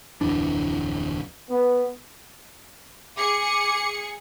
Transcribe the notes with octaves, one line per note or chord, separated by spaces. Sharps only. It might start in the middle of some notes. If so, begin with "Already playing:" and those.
D1 F2 E3 D4
B3
G#4 D6 C#7